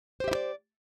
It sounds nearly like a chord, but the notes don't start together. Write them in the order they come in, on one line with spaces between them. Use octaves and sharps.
C5 G4 E5 E4 D5